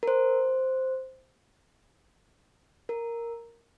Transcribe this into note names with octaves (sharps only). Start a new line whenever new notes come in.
A#4
C5
A#4